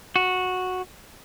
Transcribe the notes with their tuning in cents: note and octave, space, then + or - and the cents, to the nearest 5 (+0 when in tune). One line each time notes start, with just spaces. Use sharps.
F#4 -10